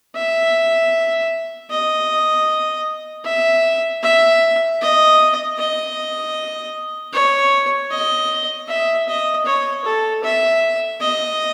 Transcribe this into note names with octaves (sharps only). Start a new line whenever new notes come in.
E5
D#5
E5
E5
D#5
D#5
C#5
D#5
E5
D#5
C#5
A4
E5
D#5